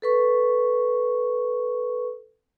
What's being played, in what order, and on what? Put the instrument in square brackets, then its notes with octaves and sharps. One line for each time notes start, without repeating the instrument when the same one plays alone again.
[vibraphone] A4 B4 C#6